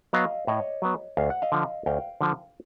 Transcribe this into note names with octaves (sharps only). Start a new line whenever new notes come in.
F#3 B3 D#5 F5
A2 C#5 D#5
F#3 B3
D2 F5
F#5
D#5 F5
D3 F3
D2 F5 G5
D3 F3